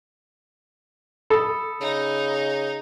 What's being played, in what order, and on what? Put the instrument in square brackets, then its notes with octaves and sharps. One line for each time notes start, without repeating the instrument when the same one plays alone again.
[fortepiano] A4 [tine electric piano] B5 D#6
[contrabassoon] C#3 [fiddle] D#4